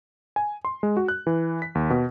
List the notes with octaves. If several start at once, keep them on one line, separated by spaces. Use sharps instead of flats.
G#5
C6
G#3
F#4
F#6
E3
B6
D#2
B2